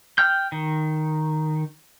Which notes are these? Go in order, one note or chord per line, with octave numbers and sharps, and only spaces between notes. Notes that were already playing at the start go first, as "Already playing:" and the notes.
G5 F6 G6
D#3